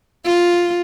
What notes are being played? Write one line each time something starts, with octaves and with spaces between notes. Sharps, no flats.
F4